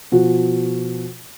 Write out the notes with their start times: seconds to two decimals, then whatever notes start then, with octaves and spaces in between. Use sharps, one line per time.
0.12 B2 F3 F4 F#4